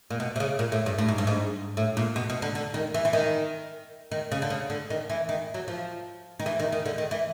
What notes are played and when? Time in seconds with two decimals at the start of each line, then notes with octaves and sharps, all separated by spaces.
0.11 A#2
0.20 B2
0.36 C3
0.40 C#3
0.59 A#2
0.72 A2
0.86 G2
0.98 A2
1.08 G#2
1.18 G2
1.27 G#2
1.77 A2
1.97 A#2
2.16 B2
2.30 B2
2.42 D3
2.55 D3
2.74 D#3
2.94 E3
3.05 E3
3.13 D#3
4.12 D#3
4.32 C#3
4.42 D3
4.50 C#3
4.70 D3
4.90 D#3
5.10 E3
5.29 D#3
5.54 F#3
5.68 F3
6.40 D#3
6.46 E3
6.60 D#3
6.72 D#3
6.86 D3
6.98 D#3
7.11 E3